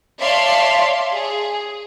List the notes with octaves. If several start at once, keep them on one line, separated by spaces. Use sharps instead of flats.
C#5 D5 E5 F5 A5 C6
G#4